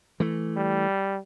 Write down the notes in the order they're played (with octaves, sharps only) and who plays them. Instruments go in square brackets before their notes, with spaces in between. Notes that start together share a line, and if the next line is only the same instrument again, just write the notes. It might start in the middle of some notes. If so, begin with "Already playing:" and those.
[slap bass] E3 A3
[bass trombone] G3